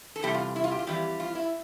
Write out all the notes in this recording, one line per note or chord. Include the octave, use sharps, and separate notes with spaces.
A4
E2 C3 G3 G4
F4
E4
F4
G4
F4
F2 E3 G3 G4
F4
E4